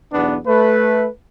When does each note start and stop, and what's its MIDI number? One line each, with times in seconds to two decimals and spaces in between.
0.13 0.37 35
0.13 0.37 40
0.13 0.37 59
0.13 0.37 62
0.47 1.07 57
0.47 1.07 71